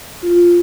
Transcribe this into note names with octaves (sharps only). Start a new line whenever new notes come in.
F4